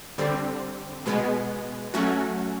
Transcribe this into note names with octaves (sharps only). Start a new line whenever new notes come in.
D3 G3 C4
B2 G#3 B3
F#3 A3 C#4 F#4